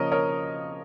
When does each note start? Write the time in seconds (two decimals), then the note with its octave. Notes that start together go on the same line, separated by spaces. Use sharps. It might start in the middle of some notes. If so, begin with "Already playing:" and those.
Already playing: C#3 F3 A#3 A#4 C#5 D#5
0.12 A#4 C#5